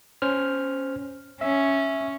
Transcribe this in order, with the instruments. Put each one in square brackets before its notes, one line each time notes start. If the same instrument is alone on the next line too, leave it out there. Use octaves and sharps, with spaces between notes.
[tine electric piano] C#4 C5 F6
[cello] C#4 [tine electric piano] E5